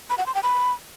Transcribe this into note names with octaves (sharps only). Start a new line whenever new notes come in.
B5
F#5
C6
G5
B5